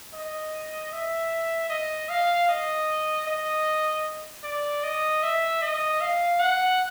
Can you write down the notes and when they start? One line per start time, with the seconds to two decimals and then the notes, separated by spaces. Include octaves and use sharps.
0.14 D#5
0.93 E5
1.70 D#5
2.09 F5
2.48 D#5
3.27 D#5
4.43 D5
4.84 D#5
5.23 E5
5.62 D#5
6.01 F5
6.40 F#5